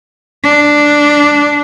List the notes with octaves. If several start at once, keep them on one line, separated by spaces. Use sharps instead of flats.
D4